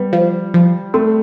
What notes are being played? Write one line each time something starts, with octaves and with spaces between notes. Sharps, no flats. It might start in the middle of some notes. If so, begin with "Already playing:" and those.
Already playing: G3 B3
F3
F3
A3 C4